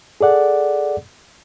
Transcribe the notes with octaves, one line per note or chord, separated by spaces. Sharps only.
G#4 A4 D5 F#5